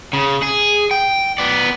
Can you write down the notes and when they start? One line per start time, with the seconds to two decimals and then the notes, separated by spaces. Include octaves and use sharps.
0.13 C#3
0.42 G#4
0.91 G5
1.38 B3 D5